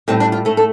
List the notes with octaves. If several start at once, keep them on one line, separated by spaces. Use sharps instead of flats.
A2 G3 C4
D4
F4
A2 A3 A4
A4